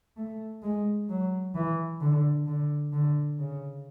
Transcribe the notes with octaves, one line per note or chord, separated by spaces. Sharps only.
A3
G#3
F#3
E3
D3
D3
D3
C#3